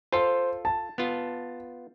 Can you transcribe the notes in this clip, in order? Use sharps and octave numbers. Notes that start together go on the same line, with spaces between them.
F4 A4 C5 C6
A5
B3 F4